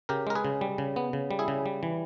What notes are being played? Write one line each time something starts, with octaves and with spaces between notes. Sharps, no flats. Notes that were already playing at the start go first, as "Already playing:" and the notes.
C#3 G4 A#4
G#3 A#4
G#4 B4
C#3
G3
C#3
B3
C#3
G3
E4 G#4
C#3
G3
E3